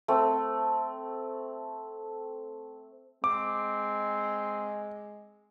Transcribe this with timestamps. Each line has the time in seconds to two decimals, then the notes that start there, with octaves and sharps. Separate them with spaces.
0.08 A3 C4
3.24 G#3 C4 D6